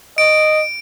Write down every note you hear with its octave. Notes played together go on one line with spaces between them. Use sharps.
D#5 D7